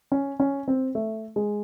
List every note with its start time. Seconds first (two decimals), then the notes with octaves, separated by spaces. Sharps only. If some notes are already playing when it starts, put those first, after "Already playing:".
0.12 C#4
0.40 C#4
0.68 C4
0.95 A3
1.36 G#3